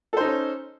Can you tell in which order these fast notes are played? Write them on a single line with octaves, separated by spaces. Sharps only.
A4 C5 D#4 C#4